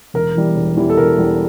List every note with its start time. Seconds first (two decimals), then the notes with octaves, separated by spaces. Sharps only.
0.14 E1 A#4
0.35 E2 E3 G3
0.55 E1
0.76 E2 E3 G3
0.90 A4
0.97 E1 A#4
1.18 E2 E3 G3